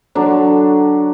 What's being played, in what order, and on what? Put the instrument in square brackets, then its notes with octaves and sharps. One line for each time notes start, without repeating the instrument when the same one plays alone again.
[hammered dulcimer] D3 F#3 D4